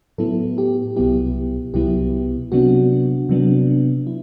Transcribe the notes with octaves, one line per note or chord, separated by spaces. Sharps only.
A2 F#3 B3 E4 A4
G4
C2 B2 F#3 B3 E4 G4
C2 B2 F#3 B3 E4 G4
C3 F#3 B3 D4 F#4
C3 F#3 B3 D4
E4